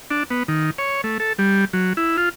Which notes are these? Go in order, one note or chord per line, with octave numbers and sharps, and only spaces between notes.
D4
B3
D#3
C#5
A3
A4
G3
F#3
E4
F4